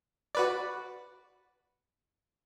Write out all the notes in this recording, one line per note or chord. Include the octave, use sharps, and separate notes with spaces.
F#4 B4 D5